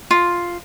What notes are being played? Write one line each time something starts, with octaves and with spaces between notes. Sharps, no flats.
F4